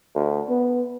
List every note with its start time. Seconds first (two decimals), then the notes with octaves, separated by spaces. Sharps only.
0.15 D2
0.49 B3